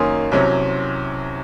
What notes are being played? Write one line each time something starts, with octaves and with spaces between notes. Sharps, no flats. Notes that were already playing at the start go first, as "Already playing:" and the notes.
Already playing: F#2 D#3 A#3 C#4 C6 D#6
C2 C3 F#3 C#4